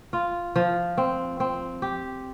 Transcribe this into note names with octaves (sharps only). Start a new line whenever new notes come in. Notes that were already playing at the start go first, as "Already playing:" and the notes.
F4
F3
C4
C4
G4